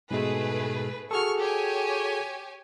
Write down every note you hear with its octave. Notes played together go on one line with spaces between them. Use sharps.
G#2 B2 G#3 A3 G#4 B4
F#4 G#4 A4 C#6 F6
G4 C#5 G#5